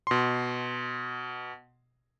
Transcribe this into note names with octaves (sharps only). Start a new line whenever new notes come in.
B2 C6